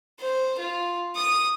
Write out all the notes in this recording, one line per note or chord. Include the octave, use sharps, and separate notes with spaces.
C5
F4
D#6